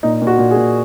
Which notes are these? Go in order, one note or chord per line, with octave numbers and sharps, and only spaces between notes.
A#2 D#4
A#2
F#4
A#2
G#4
A#2